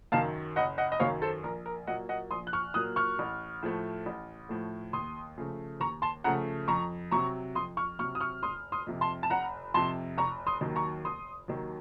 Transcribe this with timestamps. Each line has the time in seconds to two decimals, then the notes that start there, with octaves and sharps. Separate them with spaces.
0.12 F#2 D#3 F#3 F5 A5
0.56 F#1 D#5 F#5
0.78 D#5 F#5
0.92 D#5
1.00 F#2 D#3 F#3 C#5 F5
1.22 A4 C5
1.43 A#1 A#4
1.66 A#4
1.87 A#2 F#3 A#3 D#5 F#5
2.09 D#5 F#5
2.31 A#1 C6 D#6
2.47 F#6
2.53 C#6 F6
2.74 A#2 F#3 A#3 D#6 F#6
2.96 C#6 F6
3.19 A1
3.63 A2 F3 A3
4.06 A1
4.49 A2 F3 A3
4.93 D#2 C6 D#6
5.38 C#3 F3 A3
5.80 D#2 A#5 C#6
6.02 A5 C6
6.24 C#3 F3 A3 F#5 A#5
6.68 F2 A#5 C#6
7.11 C3 F#3 A#5 C#6
7.55 F2 C6 D#6
7.77 C#6 F6
7.99 C3 F#3 C#6 F6
8.15 D#6
8.20 C#6 F6
8.43 F1 C6 D#6
8.72 C6 D#6
8.87 F2 C3
9.01 A5 C6
9.23 A5
9.30 F1 F#5 A#5
9.74 F2 C3 A5 C6
10.18 F1 A#5 C#6
10.47 C6 D#6
10.61 D#2 D#3 F#3
10.76 A#5 C#6
11.05 F1 C6 D#6
11.48 D#2 D#3 F#3